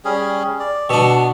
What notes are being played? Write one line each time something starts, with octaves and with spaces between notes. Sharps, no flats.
G3 C#4 G#4
D5
B2 D4 C#6 E6